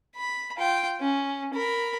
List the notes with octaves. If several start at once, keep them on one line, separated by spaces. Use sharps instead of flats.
B5
F4 G5
C#4
A#4 B5